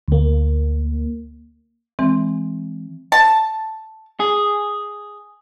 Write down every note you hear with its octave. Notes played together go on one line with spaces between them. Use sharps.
D2 A#3
E3 G#3 C4
A5
G#4